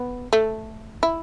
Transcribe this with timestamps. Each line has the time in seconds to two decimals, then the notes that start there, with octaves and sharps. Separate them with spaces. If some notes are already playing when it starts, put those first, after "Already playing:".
Already playing: B3
0.33 A3
1.03 E4